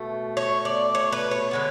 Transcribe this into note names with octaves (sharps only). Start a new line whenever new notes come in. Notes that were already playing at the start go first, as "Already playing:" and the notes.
Already playing: B2 A3
C#5
D5
C#5
B4
C#5
D3 G#3 B3